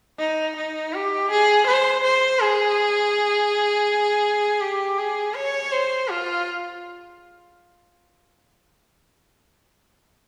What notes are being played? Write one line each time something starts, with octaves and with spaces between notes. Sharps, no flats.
D#4
D#4
G4
G#4
C5
C5
G#4
G4
G#4
C#5
C5
F4